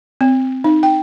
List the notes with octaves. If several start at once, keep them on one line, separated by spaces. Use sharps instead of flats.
C4
D#4
G5